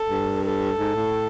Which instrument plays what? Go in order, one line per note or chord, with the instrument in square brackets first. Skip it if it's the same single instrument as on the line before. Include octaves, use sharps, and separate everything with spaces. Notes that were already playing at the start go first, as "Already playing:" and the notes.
Already playing: [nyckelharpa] A4
[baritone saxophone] G2
[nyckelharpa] A4
[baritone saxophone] G#2
A2